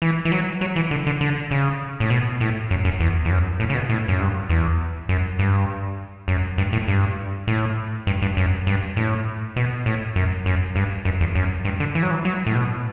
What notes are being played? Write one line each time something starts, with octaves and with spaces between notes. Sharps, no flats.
E3
E3
F#3
F#3
E3
D3
D3
D3
C#3
A2
B2
A2
F#2
F#2
E2
E2
F#2
A2
C#3
B2
A2
F#2
G2
E2
F#2
G2
F#2
G2
A2
G2
A2
G2
G2
F#2
G2
A2
B2
A2
F#2
F#2
G2
F#2
E2
F#2
G2
D3
E3
F#3
E3
F#3
A2
B2